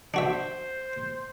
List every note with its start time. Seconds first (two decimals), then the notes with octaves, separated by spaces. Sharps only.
0.14 D4 F#4 C5 E5